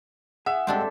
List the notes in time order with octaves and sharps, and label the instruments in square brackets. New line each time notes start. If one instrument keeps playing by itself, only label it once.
[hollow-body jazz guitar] G#4 [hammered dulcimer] E5 [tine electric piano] F#5
[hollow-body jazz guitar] G2 G#3 G4 [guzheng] C4 D4 A4